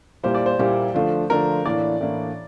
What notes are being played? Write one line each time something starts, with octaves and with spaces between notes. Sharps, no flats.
A#2 G3 A#3 E4 G4 C5
D5
C5
A#2 G3 A#3 E4 G4
D3 F3 A3 D4 F4
D3 F3 A3 D4 F4 A#4
A2 E3 A#3 D4 D5
A2 E3 A#3 D4